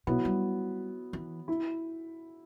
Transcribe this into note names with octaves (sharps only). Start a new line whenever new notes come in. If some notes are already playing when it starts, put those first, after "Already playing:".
B2 F#3 B3 E4 B4
G3
E3
E4